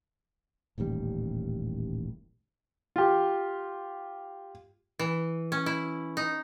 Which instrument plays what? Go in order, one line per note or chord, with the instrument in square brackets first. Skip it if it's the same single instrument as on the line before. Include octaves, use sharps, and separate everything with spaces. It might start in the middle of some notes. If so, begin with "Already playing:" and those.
[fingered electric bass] D#1 A1 D#2 G3
[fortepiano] F4 G4
[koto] E3
C#4
E4
D#4